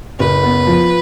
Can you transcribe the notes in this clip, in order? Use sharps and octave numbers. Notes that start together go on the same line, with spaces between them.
F#1 B4
B3
F3